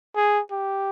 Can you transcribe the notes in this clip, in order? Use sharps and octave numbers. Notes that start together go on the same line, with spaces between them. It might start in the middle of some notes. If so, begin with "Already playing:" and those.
G#4
G4